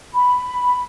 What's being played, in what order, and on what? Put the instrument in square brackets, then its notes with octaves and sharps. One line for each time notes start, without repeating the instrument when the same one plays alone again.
[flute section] B5